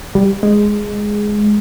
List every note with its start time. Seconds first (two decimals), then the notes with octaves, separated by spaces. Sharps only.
0.15 G3
0.43 G#3